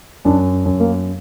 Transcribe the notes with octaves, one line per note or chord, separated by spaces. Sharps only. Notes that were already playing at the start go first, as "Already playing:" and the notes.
F#2 D4
F#2
A#3